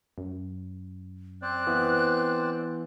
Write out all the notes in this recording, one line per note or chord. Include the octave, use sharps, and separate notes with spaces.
F#2
C4 C5 D5 F#6
E3 B3